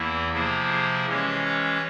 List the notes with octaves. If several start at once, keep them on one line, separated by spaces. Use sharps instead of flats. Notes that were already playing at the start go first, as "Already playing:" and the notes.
Already playing: E2 E3 A#3 E4
C3 F3 A#3 E4 G#4
E3 G#3 C#4 G4 C#5